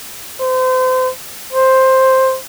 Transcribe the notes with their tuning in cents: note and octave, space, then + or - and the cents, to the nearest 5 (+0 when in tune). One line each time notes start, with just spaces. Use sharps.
C5 -35
C5 +5